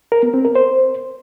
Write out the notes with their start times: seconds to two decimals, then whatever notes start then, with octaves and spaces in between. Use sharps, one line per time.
0.12 A#4
0.23 B3
0.34 C4
0.45 A#4
0.55 C5